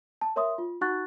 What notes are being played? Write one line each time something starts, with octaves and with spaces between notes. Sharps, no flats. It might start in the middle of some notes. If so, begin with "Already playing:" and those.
A5
A#4 C#5 E5 C6 D#6
F4
D#4 F#4 F#5 C#6 F#6 A6